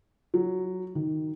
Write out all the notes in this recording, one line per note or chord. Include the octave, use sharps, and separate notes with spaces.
F#3
D#3